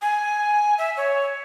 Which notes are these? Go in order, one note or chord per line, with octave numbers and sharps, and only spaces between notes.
G#5
E5
C#5